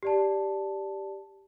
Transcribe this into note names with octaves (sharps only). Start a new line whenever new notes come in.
G4 D5 A5